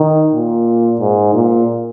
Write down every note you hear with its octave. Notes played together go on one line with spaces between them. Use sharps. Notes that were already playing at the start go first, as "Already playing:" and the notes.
Already playing: D#3
A#2
G#2
A#2